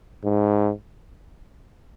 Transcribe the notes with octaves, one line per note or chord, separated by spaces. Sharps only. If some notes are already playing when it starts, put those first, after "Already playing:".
G#2